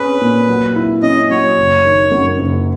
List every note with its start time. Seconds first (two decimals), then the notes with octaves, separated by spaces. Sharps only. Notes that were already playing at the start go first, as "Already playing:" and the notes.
Already playing: C#4 G#4 B4
0.21 A#2
0.48 F#3
0.76 E4
1.02 C#4 D#5
1.30 F#3 C#5
1.57 F#1
1.85 D#3
2.12 F#2
2.39 F#1